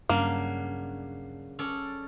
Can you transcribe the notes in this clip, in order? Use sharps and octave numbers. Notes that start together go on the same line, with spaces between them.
G2 C#3 F#3 A#3 D4
C#4 A4 D5